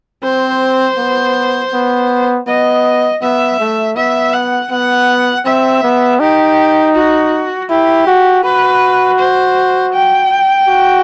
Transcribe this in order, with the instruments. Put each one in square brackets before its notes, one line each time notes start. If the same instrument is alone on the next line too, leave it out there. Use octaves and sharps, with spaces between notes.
[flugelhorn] C4 [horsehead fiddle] C5
[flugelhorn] B3
B3
[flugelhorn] B3 [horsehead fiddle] D#5
[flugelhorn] B3 [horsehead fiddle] E5
[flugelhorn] A3
[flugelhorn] B3 [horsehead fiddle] E5
[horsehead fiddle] F#5
[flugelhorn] B3 [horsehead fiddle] F#5
[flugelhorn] C4 [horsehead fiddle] E5
[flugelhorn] B3
[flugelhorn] D#4 [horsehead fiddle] G4
[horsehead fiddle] F#4
[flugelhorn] E4 [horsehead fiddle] G4
[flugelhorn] F#4
[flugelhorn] F#4 [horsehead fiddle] B4
[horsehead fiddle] C5
G5
[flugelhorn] F#4